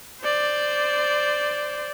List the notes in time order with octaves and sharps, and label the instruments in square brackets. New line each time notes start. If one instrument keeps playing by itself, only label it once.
[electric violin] C5 D5